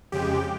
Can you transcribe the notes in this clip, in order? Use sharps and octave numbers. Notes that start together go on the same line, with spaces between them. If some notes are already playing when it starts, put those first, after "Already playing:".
F2 C#3 G#3 G4